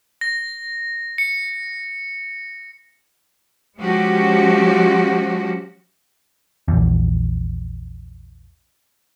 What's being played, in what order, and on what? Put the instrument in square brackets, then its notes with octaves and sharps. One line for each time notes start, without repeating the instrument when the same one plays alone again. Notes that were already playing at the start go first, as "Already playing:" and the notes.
[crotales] A#6
C#7
[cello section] F3 G#3 C#4 F#4 G4
[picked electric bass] A#1 E2